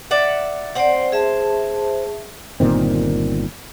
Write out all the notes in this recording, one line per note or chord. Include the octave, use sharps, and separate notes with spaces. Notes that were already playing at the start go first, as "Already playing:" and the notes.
D5 E5 F#5
C4 C5 D5 F#5
G#4 E5 A5
G1 A#2 D#3 C4